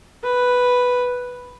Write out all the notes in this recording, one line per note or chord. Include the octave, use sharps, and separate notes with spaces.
B4